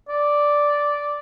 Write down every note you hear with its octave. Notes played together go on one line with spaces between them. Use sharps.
D5